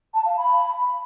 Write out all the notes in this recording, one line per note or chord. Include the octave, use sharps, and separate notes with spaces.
A5
F5
B5